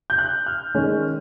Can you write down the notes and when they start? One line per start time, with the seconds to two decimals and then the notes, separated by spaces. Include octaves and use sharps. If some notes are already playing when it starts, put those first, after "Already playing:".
0.10 G6
0.18 F#6
0.46 F6
0.74 D#3 G#3 C#4